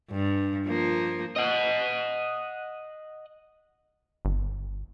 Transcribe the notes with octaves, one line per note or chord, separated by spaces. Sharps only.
G2
F3 A#3
D#5 F#5
G1